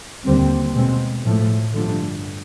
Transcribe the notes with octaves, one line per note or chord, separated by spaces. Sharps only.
D#2 D3 G3 C4
B2 G#3 C4
A2 F3 A3
G2 D3 F3 A3